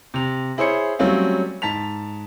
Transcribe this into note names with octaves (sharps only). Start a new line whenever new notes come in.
C3 F7
E4 G#4 C5 C#5 C#7
F#3 G3 A3 C4 C#4 F5
G#2 A5 B6 F7